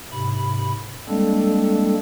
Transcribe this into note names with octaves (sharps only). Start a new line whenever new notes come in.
G#2 C3 B5
G3 G#3 A#3 C4 D4 A4